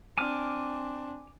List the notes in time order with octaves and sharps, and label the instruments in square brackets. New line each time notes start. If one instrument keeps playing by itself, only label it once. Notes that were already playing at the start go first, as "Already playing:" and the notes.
[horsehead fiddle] C4 D4 [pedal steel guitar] G#5 D6 F6